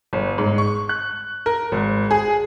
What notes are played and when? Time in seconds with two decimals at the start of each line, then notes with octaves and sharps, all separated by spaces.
0.13 G1
0.38 G#2
0.58 C#6
0.89 F#6
1.46 A#4
1.72 G#1
2.11 G#4